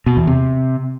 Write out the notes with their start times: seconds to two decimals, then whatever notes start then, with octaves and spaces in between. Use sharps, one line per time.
0.06 B2
0.17 E2
0.27 C3